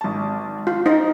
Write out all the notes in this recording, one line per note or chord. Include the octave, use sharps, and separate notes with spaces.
G#1 A5
F4
D#4 C5